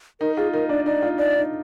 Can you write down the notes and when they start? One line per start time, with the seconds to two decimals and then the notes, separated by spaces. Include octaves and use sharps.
0.20 D#4 A#4
0.37 F4 G#4
0.53 D#4 A#4
0.69 D4 D5
0.86 D#4 D5
1.02 F4
1.18 D#4 D5
1.35 D#4